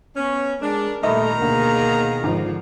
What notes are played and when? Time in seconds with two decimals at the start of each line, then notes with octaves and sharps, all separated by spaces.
0.16 B3 C#4
0.62 G#3 D4 A#4
1.03 A#2 D#3 G3 A3 D#5 E5 A#5 B5
1.40 D2 B2 A#3 G#4
2.24 G#1 D3 F3 F4